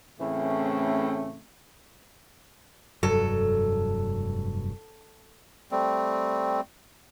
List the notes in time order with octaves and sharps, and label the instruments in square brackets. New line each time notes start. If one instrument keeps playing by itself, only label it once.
[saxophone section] A2 C#3 E3 A3 C4 C#4
[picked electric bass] F1 G2 F#3 [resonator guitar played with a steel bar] A4
[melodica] G3 A3 C4